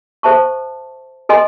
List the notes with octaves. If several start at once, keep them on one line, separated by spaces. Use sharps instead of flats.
A4 C5 E5 A5 C#6
A4 D#5 G#5 C6